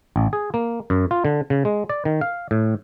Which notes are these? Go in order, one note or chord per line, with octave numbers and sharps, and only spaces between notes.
A1
G#4
A#3
F#2
F4
D3
C#3
G#3
D5
D#3
F5
A2